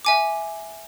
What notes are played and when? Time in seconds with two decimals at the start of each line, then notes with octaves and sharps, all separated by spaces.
0.05 E5 G#5 D6